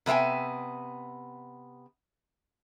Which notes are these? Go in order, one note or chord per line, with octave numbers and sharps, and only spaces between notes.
C3 B3 E5 G5 G#5